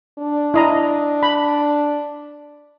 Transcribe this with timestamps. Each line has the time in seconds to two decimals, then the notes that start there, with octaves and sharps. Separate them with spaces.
0.19 D4
0.54 E4 D#5 A#5
1.23 B5